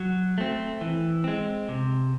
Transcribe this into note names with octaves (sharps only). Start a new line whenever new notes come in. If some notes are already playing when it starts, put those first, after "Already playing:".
Already playing: F#3
A3 C4
E3
G#3 C4
C3